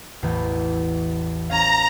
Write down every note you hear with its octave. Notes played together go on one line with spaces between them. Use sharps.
A1 E2 E3
C#4 F5 A#5